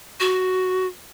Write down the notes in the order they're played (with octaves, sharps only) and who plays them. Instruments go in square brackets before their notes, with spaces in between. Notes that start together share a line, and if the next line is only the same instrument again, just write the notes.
[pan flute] F#4